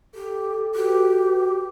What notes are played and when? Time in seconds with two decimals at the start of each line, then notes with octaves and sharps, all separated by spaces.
0.15 G4 A4
0.75 F#4 G4 B4